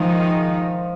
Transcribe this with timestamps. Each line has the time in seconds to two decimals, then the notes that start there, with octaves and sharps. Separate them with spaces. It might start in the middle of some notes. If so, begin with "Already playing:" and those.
Already playing: D#3 F3 G#3 D#4